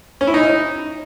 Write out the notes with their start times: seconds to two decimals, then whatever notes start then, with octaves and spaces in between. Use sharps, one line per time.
0.21 C#4
0.27 E4
0.34 D#4